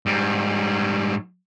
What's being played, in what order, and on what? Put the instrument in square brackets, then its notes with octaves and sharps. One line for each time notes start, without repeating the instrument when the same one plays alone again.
[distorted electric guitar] G#2 G3